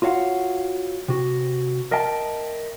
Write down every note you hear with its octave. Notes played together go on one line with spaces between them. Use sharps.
F4 F#4 C#5 F5 F#5
C3 F#4
A#4 D#5 E5 G5 A5